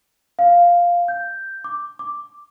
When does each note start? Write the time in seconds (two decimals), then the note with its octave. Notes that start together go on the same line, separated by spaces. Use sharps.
0.39 F5
1.08 G6
1.64 D6
1.99 D6